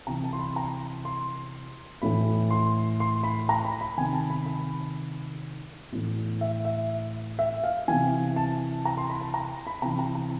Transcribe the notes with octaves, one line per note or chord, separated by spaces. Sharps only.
C3 E3 A#5
A5
C6
B5
A#5
C6
A2 E3 B5
C6
C6
B5
A#5
B5
B5
C3 D#3 G#5
A5
B5
B5
A2 E3
E5
E5
E5
F5
C3 E3 G#5
A5
A#5
C6
B5
A5
A#5
B5
C3 E3 A#5
A#5
A#5